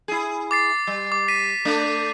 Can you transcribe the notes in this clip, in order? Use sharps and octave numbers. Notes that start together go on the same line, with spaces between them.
E4 G#4
D6 A6 C7
G3
D6
B6 D#7
A3 D4